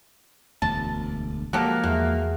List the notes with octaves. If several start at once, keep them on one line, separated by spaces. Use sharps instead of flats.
E1 D2 A5
F3 G#3 A#3 F#4 G4 A4
E2 F#4